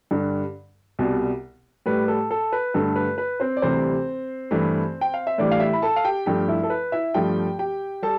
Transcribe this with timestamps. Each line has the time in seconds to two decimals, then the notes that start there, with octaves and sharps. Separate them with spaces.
0.11 G2 D3 G3
0.99 C2 B2 G3
1.86 A2 G3 B4
2.08 A4
2.31 A4
2.53 B4
2.74 G2 D3 A3 A4
2.96 B4
3.18 B4
3.40 C4 C5
3.57 D5
3.62 D2 C3 E3 G3 C4 C5
4.51 G2 E3 A3
5.01 G5
5.14 F5
5.27 E5
5.38 A2 E3 G3 D4 D5
5.51 F5
5.60 E4 E5
5.73 B5
5.82 A4 A5
5.96 F5
6.04 G4 G5
6.26 G2 F3 A3 G4 G5
6.48 E4 E5
6.63 A4
6.70 B4
6.92 E4 E5
7.14 G2 F3 A3 G4 G5
7.59 G4 G5
8.02 G3 A4 A5